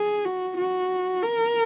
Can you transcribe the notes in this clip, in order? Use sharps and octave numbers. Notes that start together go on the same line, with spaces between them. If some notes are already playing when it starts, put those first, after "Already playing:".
Already playing: G#4
F#4
F#4
A#4